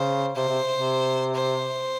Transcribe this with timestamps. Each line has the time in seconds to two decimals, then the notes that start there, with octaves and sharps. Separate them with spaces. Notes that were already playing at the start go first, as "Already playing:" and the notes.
Already playing: C#3 C5
0.36 C3 C5
0.48 C3
0.73 C3
1.35 C5